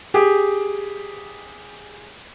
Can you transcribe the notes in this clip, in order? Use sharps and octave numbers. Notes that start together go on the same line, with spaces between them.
G4 G#4